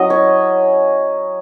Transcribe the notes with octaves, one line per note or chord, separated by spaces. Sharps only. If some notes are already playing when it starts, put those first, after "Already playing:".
Already playing: F#3 C#4 E4 D#5
C#5